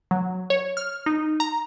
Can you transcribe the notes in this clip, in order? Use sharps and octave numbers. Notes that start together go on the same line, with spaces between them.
F#3
C#5
F6
D#4
A#5